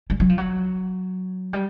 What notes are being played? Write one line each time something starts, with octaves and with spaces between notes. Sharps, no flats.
G3
F#3
F3
F#3
G3